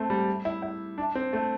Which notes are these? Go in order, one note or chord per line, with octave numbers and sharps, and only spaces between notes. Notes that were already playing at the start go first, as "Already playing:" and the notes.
Already playing: A3 C4
G3
E4
E4
D4
C4
A3